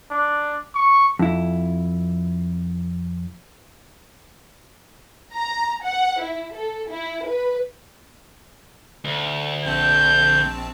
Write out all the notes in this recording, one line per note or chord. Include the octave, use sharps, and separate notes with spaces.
D4
C#6
F2 E4
A#5
F#5
E4
A4
E4
B4
D2
A#1 C4 A5 G6